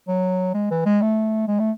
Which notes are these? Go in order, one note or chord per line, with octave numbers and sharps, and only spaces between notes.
F#3
G#3
E3
G#3
A3
G#3
A3